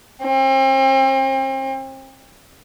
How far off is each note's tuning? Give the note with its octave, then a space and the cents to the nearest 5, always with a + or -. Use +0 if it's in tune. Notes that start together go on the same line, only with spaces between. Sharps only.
C4 +40